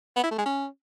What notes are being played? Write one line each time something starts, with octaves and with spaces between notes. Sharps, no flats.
B3
E4
A3
G#3
C#4